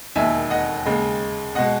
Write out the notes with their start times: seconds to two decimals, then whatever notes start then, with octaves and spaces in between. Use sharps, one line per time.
0.15 E1 D#2 D#3 E5 G#5
0.50 D#5 F#5
0.85 D#2 C#3 G#3
1.55 B2 G#3 D#5 F#5